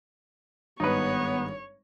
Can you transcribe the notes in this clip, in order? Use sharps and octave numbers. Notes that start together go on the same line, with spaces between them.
G#1 G2 B3 D#4 B4 C#5